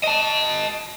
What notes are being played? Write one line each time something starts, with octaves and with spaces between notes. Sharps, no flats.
D#5 A5